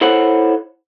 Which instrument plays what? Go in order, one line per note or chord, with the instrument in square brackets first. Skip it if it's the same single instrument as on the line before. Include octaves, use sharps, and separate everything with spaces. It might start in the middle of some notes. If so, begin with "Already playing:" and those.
[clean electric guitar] E4 A4 C5 C#5 F#5